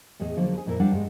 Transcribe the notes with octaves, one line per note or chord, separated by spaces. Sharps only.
E2 A2 G#4 B4 D#5
D3 F3 F#3 A#3
G#4 B4
F2 A#2 E4 A#4 E5
F3 G3 D4 E4 F#5
G2 G3 G#3